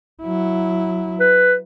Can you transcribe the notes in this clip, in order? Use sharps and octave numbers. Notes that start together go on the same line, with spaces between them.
F#3 E4
B4